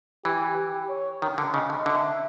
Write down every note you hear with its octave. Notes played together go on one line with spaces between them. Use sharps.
E3 G4
G4
C#5
D#3
D3
C#3 D#5
D3
D3 E5